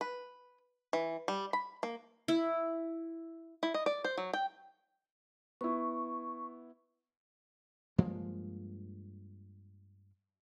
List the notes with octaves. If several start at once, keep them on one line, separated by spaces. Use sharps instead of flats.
B4
E3
G3
B5
A#3
E4
E4
D#5
D5
C5
F#3
G5
B3 E4 C#6
G2 F3 G#3 A#3